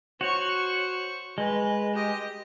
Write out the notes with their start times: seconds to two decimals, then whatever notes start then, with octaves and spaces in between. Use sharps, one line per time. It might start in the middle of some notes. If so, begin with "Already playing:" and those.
0.21 F#4 C5 C#5 C#6
1.38 G#3 B4
1.94 G4 D#5